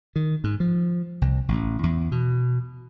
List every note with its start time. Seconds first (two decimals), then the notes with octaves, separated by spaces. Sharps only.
0.16 D#3
0.44 G#2
0.60 F3
1.22 C2
1.48 A1
1.83 E2
2.12 B2